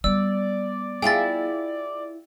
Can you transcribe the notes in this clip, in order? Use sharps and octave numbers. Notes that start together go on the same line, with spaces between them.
G3 B3 D5 E6
E4 F4 G#4 G5 A6